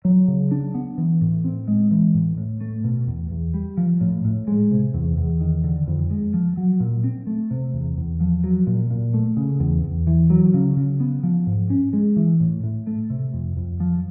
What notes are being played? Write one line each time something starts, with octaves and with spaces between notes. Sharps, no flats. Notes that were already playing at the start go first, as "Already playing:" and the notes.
F#3
C#3
D4
B3
E3
A2
C4
G#3
E3
A2
A2
A3
B2
E2
E2
G3
F3
A2
A2
G#3
C3
E2
E2
D#3
D3
F2
G#3
F3
F#3
A#2
C4
A3
C3
E2
E2
F3
F#3
A#2
A#2
A3
C#3
E2
E2
E3
F#3
C#3
C#3
B3
F3
G#2
C#4
G#3
E3
A2
A2
A3
C3
F2
F2
F3